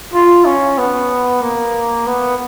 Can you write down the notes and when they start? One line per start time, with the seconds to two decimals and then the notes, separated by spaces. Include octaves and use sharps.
0.14 F4
0.45 C#4
0.78 B3
1.42 A#3
2.07 B3